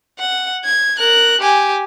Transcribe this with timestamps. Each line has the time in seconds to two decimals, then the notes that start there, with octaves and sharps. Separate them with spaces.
0.19 F#5
0.65 G#6
0.98 A#4 F#6
1.41 G4 G#5